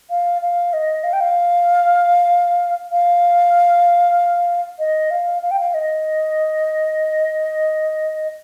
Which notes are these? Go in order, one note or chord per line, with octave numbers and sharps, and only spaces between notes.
F5
F5
D#5
F5
G5
F5
F5
D#5
F5
F5
G5
F5
D#5